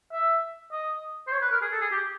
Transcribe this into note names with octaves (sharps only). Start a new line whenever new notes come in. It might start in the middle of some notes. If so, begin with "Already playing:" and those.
E5
D#5
C5
C#5
B4
A#4
G#4
A4
G#4
G4